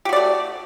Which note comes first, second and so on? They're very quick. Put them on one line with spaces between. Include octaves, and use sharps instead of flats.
G4 F#4 D5 A3